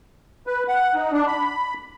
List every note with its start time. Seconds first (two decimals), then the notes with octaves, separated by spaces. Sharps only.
0.47 B4
0.68 F#5
0.95 D#4
1.12 D4
1.27 B5